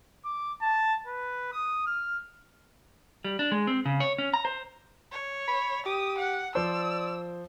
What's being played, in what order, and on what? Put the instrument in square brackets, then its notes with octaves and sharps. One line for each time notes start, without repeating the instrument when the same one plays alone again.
[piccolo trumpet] D6
A5
B4
D#6
F6
[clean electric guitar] G3
D4
G#3
C4
C#3
C#5
C#4
A#5
C5
[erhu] C#5
[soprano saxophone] B5
[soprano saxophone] G4 [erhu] D#6
[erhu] F#5
[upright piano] F3 C5 [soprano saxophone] D5 [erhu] E6